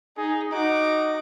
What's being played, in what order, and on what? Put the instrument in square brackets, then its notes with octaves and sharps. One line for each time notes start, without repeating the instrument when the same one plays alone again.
[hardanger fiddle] D#4 [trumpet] G#4
[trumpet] D#4 [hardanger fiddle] F#4 D6